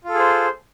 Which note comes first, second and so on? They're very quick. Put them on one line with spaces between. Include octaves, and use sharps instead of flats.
F4 A4 G#4 C5